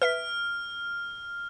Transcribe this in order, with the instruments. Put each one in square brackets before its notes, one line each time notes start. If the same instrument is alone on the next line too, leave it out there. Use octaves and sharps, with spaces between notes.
[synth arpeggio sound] B4 E5 B6 [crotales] F6